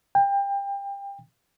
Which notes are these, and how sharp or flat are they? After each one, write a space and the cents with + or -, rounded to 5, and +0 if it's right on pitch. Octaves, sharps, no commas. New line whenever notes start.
G5 +25